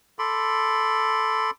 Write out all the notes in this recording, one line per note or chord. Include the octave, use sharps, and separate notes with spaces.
A4 B5 C6 D6